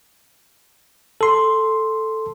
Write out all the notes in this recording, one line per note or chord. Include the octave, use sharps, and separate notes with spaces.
A4 C6